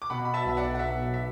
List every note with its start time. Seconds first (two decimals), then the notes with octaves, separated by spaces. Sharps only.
0.02 D6
0.10 B2 F#5 B5
0.25 B5
0.34 E5 A5
0.45 B1 E5
0.57 D5 F#5
0.75 F#5
0.79 B1 E5
1.14 E5